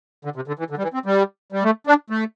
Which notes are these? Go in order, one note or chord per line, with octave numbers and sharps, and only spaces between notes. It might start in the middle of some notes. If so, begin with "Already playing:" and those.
D3
C3
D3
E3
D3
G3
E3
C4
G3
G3
A3
D4
A3